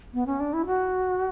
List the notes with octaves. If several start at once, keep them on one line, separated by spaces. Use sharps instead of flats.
B3
C#4
D4
E4
F#4